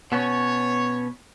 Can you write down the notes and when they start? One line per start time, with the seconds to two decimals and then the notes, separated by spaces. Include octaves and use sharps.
0.12 B2 B3 C#4 C#5